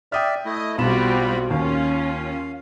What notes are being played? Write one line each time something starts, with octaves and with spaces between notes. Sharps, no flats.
D5 E5 G5 D#6 F6
A3 E4 D#5
B1 G3 C4 F4 F#4 B5 E7
D#2 C#4 F4 F5